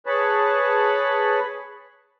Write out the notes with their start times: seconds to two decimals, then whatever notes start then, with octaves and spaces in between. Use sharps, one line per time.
0.06 G#4 B4 C#5 A5 B5